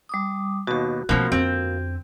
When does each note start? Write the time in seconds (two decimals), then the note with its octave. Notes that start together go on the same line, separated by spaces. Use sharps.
0.09 G3 D6 D#6
0.67 D#2 B2 F#4
1.09 B2 F3 A3 A#3 C#4
1.32 F2 D3 C4